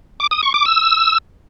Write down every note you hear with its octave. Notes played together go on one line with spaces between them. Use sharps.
D6
D#6
C#6
D6
E6